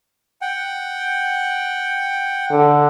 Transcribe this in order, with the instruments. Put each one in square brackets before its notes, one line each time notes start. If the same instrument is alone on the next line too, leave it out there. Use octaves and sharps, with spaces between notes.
[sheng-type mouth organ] F#5 G5
[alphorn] D3